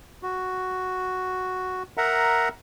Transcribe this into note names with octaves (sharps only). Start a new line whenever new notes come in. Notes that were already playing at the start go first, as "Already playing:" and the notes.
F#4
A#4 E5 F#5 A#5